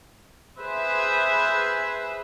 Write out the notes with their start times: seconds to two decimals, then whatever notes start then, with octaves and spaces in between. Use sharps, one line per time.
0.59 G#4 B4 C5 E5